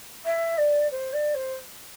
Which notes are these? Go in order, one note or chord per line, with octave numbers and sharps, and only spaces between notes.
E5
D5
C5
D5
C5